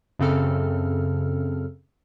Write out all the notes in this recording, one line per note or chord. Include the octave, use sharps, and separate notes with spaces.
F#2 C#3 C4 A4 F6